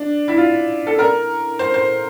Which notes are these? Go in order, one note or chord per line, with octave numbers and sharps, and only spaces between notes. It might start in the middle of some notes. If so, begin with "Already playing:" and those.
Already playing: D4
E4
F4
A4
A#4
C5
C5